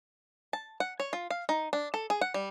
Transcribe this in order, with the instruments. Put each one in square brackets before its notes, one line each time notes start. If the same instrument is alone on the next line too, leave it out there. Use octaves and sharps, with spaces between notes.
[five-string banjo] A5
F#5
C#5
F4
F5
D#4
D4
A4
G#4
F#5
G3